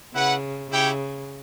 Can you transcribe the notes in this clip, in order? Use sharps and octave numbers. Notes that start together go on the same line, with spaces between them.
C#3 E4 B4 F#5
C#3 E4 G4 C#5 G5